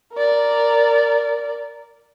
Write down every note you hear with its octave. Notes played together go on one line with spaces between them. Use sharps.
A#4 D5